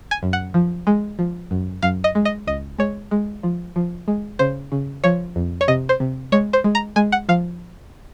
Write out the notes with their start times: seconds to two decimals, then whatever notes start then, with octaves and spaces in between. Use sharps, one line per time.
0.11 G#5
0.23 F#2
0.33 F#5
0.54 F3
0.87 G#3
1.19 F3
1.51 F#2
1.82 F#2 F5
2.04 D#5
2.15 G#3
2.25 D#5
2.47 C#2 D#5
2.78 G#3 C#5
3.11 G#3
3.43 F3
3.76 F3
4.08 G#3
4.39 C#3 C5
4.72 C#3
5.04 F3 C#5
5.36 F2
5.61 C#5
5.68 C3 D#5
5.89 C5
6.00 C3
6.32 G#3 C#5
6.53 C5
6.64 G#3
6.75 A#5
6.96 G#3 G#5
7.12 F#5
7.29 F3 F5